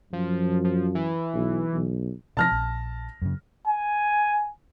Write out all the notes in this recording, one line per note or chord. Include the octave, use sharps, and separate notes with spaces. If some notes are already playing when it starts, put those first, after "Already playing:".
F#2 F3
F3
E3
B1
B1
C3 F3 A5 F6 A#6
A#1
F#2 C#3
G#5